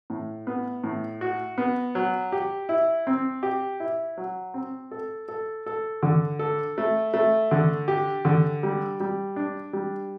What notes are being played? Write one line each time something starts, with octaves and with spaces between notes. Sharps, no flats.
A2
B3
A2
F#4
B3
F#3
G4
E4
C4
G4
E4
F#3
C4
A4
A4
A4
D3
A4
A3
A3
D3
G4
D3
G3
G3
D4
G3